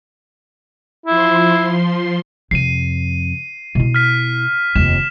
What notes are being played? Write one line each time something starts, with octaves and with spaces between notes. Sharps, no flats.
F3 E4 C6
F2 C3 C7 D#7
B2 E4
F6 B6
F1 D#2 E7